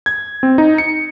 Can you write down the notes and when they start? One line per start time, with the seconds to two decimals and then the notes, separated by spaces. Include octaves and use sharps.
0.06 G#6
0.43 C4
0.58 D#4
0.78 C#7